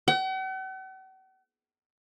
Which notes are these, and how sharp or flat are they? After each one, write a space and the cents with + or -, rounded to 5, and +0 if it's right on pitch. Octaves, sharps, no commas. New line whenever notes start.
F#5 +45